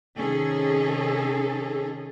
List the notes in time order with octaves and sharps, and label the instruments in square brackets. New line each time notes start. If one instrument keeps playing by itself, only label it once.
[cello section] C3 D#3 C#4 G#4 A4